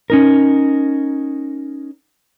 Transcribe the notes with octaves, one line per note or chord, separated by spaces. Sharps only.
C#4 D#4 A#4